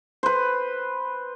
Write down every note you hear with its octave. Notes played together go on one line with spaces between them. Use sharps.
B4 C5